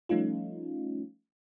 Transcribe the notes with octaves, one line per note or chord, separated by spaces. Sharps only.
F3 G3 A3 C#4 D#4 F4